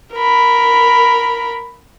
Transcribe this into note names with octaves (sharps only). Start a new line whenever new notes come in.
A#4 B5